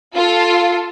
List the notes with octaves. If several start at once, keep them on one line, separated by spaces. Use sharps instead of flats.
F4 A4